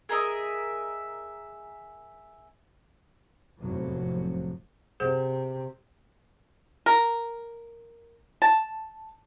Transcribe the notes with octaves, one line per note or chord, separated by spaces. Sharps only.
G#4 A#4 D#5 E5
F1 E2 A2 C3 F3 F#3
C3 G#4 C5 F#5
A#4
A5